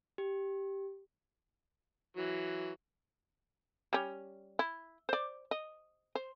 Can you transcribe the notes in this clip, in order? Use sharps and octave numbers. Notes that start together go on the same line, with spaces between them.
G4
E3 F#3
G3 C#4
E4
C5 D5
D#5
C5